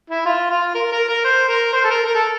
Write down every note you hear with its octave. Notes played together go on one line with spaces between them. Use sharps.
E4
F4
F4
A#4
A#4
A#4
C5
A#4
C5
A4
A#4
A#4
A4